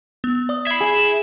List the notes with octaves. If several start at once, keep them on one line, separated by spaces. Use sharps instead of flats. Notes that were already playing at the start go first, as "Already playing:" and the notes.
B3
D5 D#6
E5 B5 G#6 C7
G#4